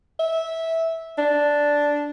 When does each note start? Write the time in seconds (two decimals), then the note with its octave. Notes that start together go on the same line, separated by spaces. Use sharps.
0.19 E5
1.18 D4